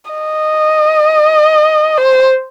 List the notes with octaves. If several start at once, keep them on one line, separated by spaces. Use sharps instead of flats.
D#5
C5